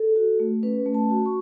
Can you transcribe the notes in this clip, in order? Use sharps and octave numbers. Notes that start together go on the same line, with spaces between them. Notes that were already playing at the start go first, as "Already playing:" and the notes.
Already playing: A4
F#4
A3
C#4 B4
A3
A5
F#4
C#6